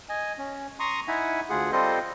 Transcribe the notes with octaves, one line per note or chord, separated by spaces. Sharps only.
D#5 G#5
C#4
A#5 C6 C#6 D#6
D#4 E4 E5 F#5 G#5
D2 F4 G#4 F#5
G3 C4 F4 A4 C5 D#5